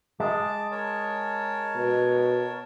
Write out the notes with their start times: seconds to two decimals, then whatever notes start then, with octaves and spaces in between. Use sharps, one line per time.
0.20 G#3 A5 D6
0.71 A#4 C#5 A5
1.76 B2